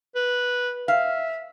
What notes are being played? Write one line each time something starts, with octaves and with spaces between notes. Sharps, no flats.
B4
E5 F5